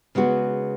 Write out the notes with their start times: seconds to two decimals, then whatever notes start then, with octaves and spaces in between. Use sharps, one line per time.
0.15 C#3 G#3 B3 F#4